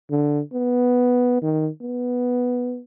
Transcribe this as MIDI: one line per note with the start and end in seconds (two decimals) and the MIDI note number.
0.11 0.40 50
0.53 1.42 59
1.42 1.68 51
1.81 2.80 59